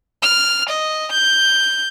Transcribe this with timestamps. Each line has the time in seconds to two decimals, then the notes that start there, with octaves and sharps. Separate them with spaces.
0.22 F6
0.69 D#5
1.12 G6